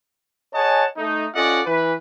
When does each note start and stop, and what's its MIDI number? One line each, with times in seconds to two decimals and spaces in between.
0.54 0.84 68
0.54 0.84 73
0.54 0.84 75
0.54 0.84 78
0.54 0.84 80
0.54 0.84 81
0.96 1.26 57
0.96 1.26 63
1.34 1.61 61
1.34 1.61 65
1.34 1.61 69
1.34 1.61 74
1.34 1.61 75
1.34 1.61 78
1.66 1.92 52
1.66 1.92 71